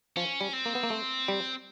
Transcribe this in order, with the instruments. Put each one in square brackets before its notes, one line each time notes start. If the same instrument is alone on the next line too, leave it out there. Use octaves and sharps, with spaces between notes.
[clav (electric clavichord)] F3 [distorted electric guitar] C#4
[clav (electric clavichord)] G3
[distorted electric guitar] C4
[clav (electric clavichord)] A#3
B3
A#3
A3
G3